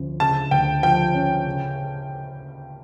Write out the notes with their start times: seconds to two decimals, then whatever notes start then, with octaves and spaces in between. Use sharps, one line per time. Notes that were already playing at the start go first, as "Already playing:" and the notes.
Already playing: D2 F3 C#4
0.20 C#3 A5
0.51 D2 G5
0.83 F3 G5
1.14 C#4
1.46 C#3